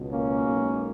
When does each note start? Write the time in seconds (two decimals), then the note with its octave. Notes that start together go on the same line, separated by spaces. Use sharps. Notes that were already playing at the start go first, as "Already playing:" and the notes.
Already playing: C#2 B2
0.11 A#3 C#4
0.46 B1 B2 G#3